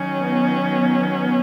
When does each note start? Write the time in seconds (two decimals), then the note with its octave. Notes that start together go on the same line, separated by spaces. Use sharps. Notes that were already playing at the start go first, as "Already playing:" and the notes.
Already playing: D#3 F#3 C#4
0.20 B3